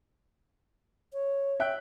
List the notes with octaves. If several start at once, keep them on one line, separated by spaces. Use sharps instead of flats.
C#5
E5 G5 F#6